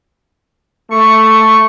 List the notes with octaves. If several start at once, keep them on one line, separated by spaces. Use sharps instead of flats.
A3 C#6